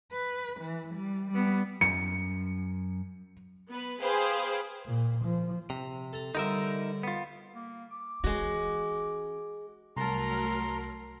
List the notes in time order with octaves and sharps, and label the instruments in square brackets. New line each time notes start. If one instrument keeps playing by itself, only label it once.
[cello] B4
E3
G3
G3 B3
[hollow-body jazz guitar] F#2 [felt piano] C#7
[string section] B3 B4
G#4 B4 C5 F5 G5
[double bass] A#2
F3
[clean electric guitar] C3 [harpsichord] A#5
[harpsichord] A4 A5 A#5
[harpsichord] D3 G3 C5 [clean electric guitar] D#4 A#4 E5
[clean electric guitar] B3 F4
[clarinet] A#3
D6
[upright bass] E3 C#4 [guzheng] G#3 F#4
[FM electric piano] C2 A5 [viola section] F#3 A3 A#4 [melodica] A#5 C6